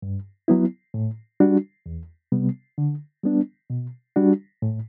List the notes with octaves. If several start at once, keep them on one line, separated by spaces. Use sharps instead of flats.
G2
F#3 B3 E4
A2
G3 D4 F#4
E2
C3 G3 B3
D3
G3 B3 D4
B2
G3 D4 F#4
A2